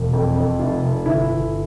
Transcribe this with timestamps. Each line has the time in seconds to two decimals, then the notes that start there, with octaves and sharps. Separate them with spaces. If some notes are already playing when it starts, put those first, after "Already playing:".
Already playing: E1
0.13 F2
0.36 F2
0.59 F1 F4
0.83 F1
1.06 G1 E4
1.29 G1